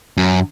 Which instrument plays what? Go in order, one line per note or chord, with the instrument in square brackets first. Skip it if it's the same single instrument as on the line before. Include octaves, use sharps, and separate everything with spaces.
[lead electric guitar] F#2